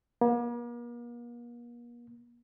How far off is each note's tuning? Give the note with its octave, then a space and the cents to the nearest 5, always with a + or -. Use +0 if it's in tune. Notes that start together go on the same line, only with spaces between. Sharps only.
A#3 +45